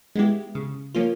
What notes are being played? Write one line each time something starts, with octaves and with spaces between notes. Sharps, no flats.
G#3 B3 E4 G4
C#3
F3 A#3 C#4 F4